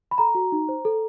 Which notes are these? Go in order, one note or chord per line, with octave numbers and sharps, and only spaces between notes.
B5
A4 A#5
F#4
D#4
C5
A4